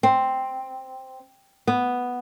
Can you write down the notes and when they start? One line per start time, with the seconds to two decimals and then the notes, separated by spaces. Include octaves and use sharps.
0.03 C4
1.67 B3